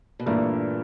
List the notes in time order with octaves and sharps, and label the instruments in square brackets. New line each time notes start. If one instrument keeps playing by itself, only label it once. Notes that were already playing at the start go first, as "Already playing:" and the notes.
[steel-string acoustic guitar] B2
[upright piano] G2 E3 A3 D4 [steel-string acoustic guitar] A#2